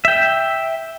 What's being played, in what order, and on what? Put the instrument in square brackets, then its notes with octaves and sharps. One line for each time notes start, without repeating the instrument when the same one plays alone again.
[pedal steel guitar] E5 G5